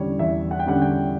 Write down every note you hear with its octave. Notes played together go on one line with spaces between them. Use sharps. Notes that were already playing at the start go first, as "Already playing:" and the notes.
Already playing: E2 D3 G3 C#4 C#5
E2 E5
F#5
G5
D3 G3 C#4 F#5
G5